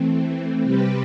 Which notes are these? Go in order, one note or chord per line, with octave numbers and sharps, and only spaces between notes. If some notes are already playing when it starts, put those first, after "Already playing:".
Already playing: E3 A3 C4
C3 G3 C4 G4 B4